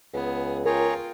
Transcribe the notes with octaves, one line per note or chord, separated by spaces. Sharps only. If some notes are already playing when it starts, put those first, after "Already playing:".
C#2 B3 G#4
F4 G#4 A#4 C#5 G5 A#5